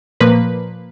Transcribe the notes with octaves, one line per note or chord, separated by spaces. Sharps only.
A#2 F3 A#3 B4